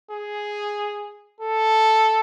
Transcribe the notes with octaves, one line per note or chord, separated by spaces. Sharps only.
G#4
A4